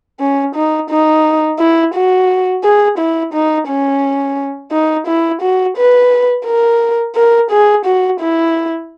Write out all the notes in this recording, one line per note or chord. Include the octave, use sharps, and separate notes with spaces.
C#4
D#4
D#4
E4
F#4
G#4
E4
D#4
C#4
D#4
E4
F#4
B4
A#4
A#4
G#4
F#4
E4